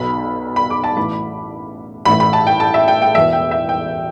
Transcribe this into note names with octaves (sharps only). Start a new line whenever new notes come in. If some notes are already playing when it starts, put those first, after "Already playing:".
Already playing: B1 B2 B5
B5
D6
A5
A1 A2 E3 B5
A1 A2 E3 B5
B5
A5
G5
A5
E5
G5
G5
E1 E2 B2 E5
G5
E5
G5